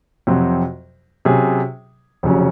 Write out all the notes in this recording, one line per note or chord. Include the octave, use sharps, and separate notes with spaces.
F2 C3 F#3 C4 F#4
C3 F#3 C#4 G#4
F1 F2 C#3 F#3 C#4